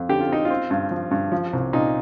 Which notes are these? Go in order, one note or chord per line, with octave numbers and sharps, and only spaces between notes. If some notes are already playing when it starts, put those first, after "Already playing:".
Already playing: F2
D3 G4
F4
C4 D#4
F4
C4
G2
F3
G2
F3
C2
A#2 D#4